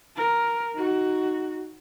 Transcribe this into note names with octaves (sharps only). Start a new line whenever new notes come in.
A#4
D#4 F#4